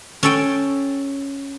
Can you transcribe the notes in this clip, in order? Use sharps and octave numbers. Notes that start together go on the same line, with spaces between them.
C#4 A4 G5